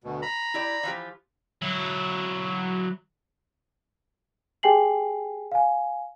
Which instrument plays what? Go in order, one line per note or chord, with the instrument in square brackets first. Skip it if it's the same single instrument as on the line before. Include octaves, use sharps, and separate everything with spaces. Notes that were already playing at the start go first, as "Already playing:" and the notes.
[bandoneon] D2 B2
A#5 B5
[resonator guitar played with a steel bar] E4 G4 D5
E3 F3 G4
[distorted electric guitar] F#3 E4
[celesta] G4 G#4 G5 G#5 C7 F#7
F5 G#5